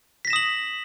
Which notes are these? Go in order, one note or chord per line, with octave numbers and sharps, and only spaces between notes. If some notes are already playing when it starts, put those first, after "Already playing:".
D#6 A#6 B6 E7 F#7